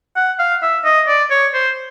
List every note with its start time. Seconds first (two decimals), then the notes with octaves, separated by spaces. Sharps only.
0.16 F#5
0.39 F5
0.63 E5
0.85 D#5
1.08 D5
1.31 C#5
1.54 C5